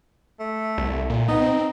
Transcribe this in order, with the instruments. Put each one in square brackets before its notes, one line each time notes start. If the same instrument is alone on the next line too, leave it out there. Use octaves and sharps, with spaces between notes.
[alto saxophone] A3
[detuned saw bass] C2
A#2
[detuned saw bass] B3 [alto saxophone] D#4
[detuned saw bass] C4